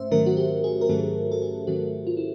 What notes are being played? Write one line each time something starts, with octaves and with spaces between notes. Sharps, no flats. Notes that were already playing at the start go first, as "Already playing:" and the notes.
Already playing: G#2 A3 C#4 C5 E5
G#2 D#3 F#3 A3 C#4 A#4
F#4
G4
G#4
A#4
G#2 D#3 F#3 A3 C#4 A4
A4
G#4
G#2 D#3 F#3 A3 C#4 F#4
F4
E4